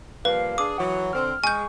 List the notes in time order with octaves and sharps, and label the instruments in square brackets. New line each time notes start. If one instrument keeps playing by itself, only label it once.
[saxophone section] F3 G3 A#3 [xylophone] B4 [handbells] F5
[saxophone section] D4 G#4 [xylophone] D6 [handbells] D#6
[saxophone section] E3 F#3 [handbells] F#5 C#6
[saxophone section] D3 C4 [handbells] F6
[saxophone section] G#3 [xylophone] G#5 G6 [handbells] C#6